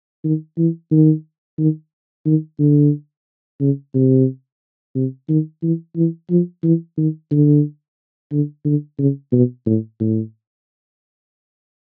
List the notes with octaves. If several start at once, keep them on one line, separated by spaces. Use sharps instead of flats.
D#3
E3
D#3
D#3
D#3
D3
C#3
C3
C3
D#3
E3
E3
F3
E3
D#3
D3
D3
D3
C#3
B2
A2
A2